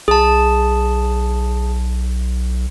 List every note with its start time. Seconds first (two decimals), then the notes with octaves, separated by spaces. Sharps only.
0.08 B1 G#4 A5